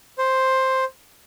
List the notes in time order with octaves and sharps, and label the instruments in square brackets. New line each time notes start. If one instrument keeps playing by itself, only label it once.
[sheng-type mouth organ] C5